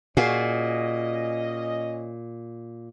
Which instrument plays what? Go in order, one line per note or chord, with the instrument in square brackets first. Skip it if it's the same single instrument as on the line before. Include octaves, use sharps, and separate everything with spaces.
[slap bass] A#2 [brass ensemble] C#4 D#5 [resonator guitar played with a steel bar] F4 F#4 G#4